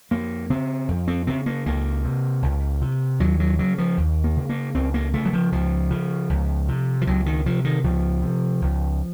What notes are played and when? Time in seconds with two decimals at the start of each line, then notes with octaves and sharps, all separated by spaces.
0.11 F2 A#3
0.50 C#3 C4
0.88 F2
1.08 C4
1.27 C#3 C4
1.46 A#3
1.66 C#2 A#3
2.04 C3
2.42 C#2
2.81 C3
3.20 D#2 F#3
3.40 F#3
3.59 C#3 F#3
3.78 F3
3.97 D#2
4.24 A#3
4.37 C#3
4.49 A#3
4.74 C#2 C4
4.94 A#3
5.13 C#3 A3
5.25 F#3
5.33 F3
5.52 C#2 F3
5.91 C#3
6.30 C#2
6.68 C3
7.01 F3
7.07 C#2 F#3
7.26 D#3
7.46 C3 F3
7.64 D#3
7.84 C#2 F3
8.22 C3
8.61 C#2